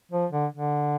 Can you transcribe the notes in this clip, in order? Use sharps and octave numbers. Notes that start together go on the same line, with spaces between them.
F3
D3
D3